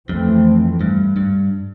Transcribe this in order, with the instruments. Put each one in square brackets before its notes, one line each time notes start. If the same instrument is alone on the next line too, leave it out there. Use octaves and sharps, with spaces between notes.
[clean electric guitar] F2 [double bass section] E3 A3 C4
[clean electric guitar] G2
G2